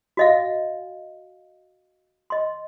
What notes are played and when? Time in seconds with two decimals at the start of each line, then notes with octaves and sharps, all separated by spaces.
0.17 F#4 D#5 F5
2.30 D#5 C6